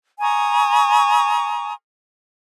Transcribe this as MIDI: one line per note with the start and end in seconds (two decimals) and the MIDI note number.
0.21 1.73 80
0.21 1.73 82
0.21 1.73 85
0.21 1.73 87